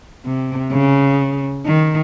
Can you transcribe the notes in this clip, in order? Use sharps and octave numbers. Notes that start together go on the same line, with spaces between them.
C3
C#3
D#3